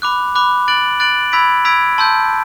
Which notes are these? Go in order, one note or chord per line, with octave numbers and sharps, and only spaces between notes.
B5 D6 F#6
B5 D6 F#6
F#6 A6 D7 F#7
F#6 A6 D7 F#7
B5 E6 G#6 B6 D7
B5 E6 G#6 B6 D7
A5 C6 E6 G6